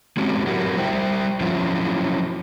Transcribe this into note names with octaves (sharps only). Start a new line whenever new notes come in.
G#3 C4 C#4 F#4 G4
F#3 E4 F#4 G4 A#4
G3 C5 E5 G5
F3 F#3 C#4 E4 F4